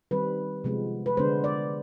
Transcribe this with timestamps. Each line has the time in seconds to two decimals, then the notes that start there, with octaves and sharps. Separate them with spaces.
0.11 D#3 G3 C4 B4
0.64 C3 F3 G#3 B3
1.06 B4
1.17 D3 G#3 B3 D4 C5
1.44 D5